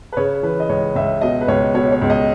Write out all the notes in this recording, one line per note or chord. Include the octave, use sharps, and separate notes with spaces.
B4
C#3 C#5
E3 B4
D#5
C#2 C#5
C#2 E5
B2 D#5
B4
C#2 C#5
B2 C#5
C#5
C#2
D#5